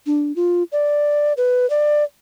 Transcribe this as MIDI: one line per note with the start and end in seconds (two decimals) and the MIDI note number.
0.06 0.35 62
0.36 0.63 65
0.72 1.33 74
1.37 1.68 71
1.70 2.04 74